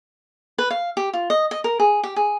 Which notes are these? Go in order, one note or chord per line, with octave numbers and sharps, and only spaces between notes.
B4
F5
G4
F4
D#5
D#5
A#4
G#4
G4
G#4